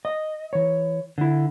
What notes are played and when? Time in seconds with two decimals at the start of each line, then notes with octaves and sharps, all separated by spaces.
0.05 D#5
0.53 E3 C#5
1.18 D3 E4